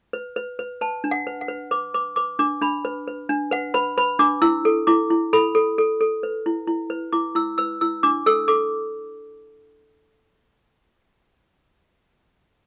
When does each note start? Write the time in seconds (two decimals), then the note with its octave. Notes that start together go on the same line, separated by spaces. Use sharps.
0.13 B4
0.36 B4
0.59 B4
0.81 B4 A5
1.04 D4
1.11 F#5
1.27 B4
1.41 F#5
1.48 B4
1.71 B4 D6
1.94 B4 D6
2.16 B4 D6
2.39 D4 D6
2.61 D4 B5
2.85 B4
3.07 B4
3.29 D4
3.51 B4 F#5
3.74 B4 B5
3.98 B4 B5
4.19 D4 D6
4.42 E4 E6
4.65 A4
4.87 E4 D6
5.11 E4
5.33 A4 B5
5.55 A4
5.78 A4
6.01 A4
6.23 B4
6.46 E4
6.67 E4
6.90 B4
7.13 E4 D6
7.35 E4 E6
7.58 B4 E6
7.81 E4 E6
8.03 D4 D6
8.26 A4 E6
8.48 A4 D6